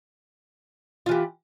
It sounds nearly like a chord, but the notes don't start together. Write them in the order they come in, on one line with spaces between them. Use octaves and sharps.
F4 E3 G4